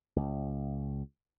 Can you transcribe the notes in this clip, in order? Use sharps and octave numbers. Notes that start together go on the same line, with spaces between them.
C#2